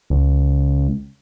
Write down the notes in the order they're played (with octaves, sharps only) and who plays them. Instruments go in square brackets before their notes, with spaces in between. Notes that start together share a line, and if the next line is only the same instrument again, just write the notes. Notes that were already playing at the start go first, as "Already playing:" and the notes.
[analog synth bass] C#2